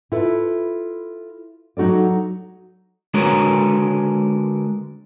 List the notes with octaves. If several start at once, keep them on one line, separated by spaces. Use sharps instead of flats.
E4 F4 A4 B4
F#3 D#4 F#4 A4 D5
D3 G#3 F#4 A#4 B4 C#5